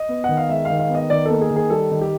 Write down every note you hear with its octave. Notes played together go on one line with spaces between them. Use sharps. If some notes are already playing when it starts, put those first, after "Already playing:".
Already playing: D#5
B3
D#3 F#5
F5
G#3 E5
D#3 F5
F5
B3
D#5
D#3 D5
A#3 A4
G#4
D#3
G#4
G3 A4
D#3
G4